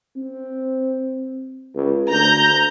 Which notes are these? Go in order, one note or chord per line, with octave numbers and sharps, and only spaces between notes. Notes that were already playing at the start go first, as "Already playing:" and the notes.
C4
C#2
D2 A#5 G6